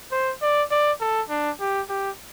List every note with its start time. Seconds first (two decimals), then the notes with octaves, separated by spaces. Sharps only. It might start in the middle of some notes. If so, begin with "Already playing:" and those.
0.12 C5
0.42 D5
0.71 D5
1.00 A4
1.30 D4
1.60 G4
1.89 G4